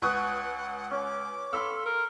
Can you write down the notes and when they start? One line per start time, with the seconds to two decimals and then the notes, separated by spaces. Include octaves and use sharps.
0.02 C#2 B4 F#5 C#6 D#6
0.91 C#4 D6
1.53 A4 F5 B5 C6 E6
1.86 A#4